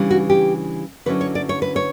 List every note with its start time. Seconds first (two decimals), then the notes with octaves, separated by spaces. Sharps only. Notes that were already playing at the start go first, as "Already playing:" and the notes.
Already playing: C#3 E3 G3 D4
0.10 F#4
0.30 G4
1.06 D3 F#3 C#4 E4 B4
1.21 C#5
1.35 D5
1.49 C#5
1.62 B4
1.76 C#5